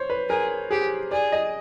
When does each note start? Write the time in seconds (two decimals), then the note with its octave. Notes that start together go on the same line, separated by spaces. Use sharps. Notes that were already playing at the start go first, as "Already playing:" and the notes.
Already playing: C5 C#5
0.10 B4
0.29 G#4 A#4
0.70 G4 G#4
1.11 G#4 D5
1.32 D#5